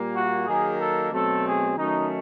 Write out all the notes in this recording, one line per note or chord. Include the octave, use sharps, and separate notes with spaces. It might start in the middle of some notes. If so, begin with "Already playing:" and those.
Already playing: A#2 G3 A#3
F#4
D#3 F#3 A#3 G#4
A4
B2 F#3 A3 C4 A4
G#4
D#3 F#3 A3 C#4 D#4